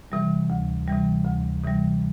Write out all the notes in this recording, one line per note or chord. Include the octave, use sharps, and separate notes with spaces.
C3 E3 G3
D2
C3 E3 G3
D2
C3 E3 G3